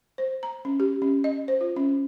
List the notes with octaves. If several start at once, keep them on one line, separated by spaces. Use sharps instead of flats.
C5
A#5
C#4
G4
C#4
D#5
C5
F4
C#4